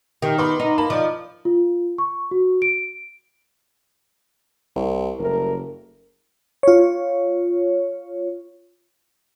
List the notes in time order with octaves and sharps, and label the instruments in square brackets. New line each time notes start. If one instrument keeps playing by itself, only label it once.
[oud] D#3 [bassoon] G4
[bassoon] B3 [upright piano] B5 C6 D6
[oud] D#4
[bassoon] A#3 [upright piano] A5 B5
[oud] F3 [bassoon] D#4 [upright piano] D5 D6
[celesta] F4
C#6
F#4
D7
[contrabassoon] C2
[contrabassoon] F#1 [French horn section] G3 A3 A#4
[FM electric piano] F4 C#5